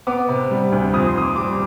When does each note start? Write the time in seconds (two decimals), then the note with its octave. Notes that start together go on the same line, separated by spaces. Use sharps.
0.07 B3 D6
0.29 C3
0.51 G3
0.72 D2
0.93 F2 D#6
1.08 C6
1.15 D#3 D#6
1.22 D6
1.36 G3 D6